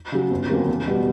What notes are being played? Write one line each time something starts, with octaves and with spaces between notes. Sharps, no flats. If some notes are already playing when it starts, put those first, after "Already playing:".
C#3 F#3
G1
F2 C#3 F#3 A#3
E2
B2 G3 B3